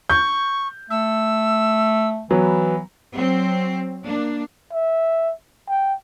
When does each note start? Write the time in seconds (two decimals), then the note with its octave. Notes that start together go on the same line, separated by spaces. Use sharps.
0.10 C#6 G6
0.90 A3 E6
2.31 E3 F#3 B3
3.15 F#3 C4
4.03 A#3 D4
4.73 E5
5.69 G5